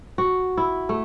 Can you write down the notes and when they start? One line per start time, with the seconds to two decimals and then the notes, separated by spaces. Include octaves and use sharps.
0.18 F#4
0.57 E4
0.89 A3